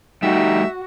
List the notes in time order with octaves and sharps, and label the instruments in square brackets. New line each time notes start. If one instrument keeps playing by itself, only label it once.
[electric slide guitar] G3 A3 G4 [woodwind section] D#4 [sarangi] F#4 [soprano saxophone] E5